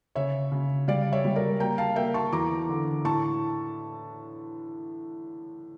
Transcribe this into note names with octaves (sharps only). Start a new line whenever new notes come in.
C#3 C#5 E5
C#3
G3 D5 F5
C#5 E5
G3
A#4 D5
A#3 G5 A#5
F5 A5
A#3 E5 G5
A5 C#6
E2 A#5 D6
D3
A2 A5 C#6